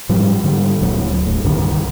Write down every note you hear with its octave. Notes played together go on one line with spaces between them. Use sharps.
G#2 F3 G3
G#2 D3 G3
D1 D2 A#2 F#3
D#1 A2
C2 G2 D3 D#3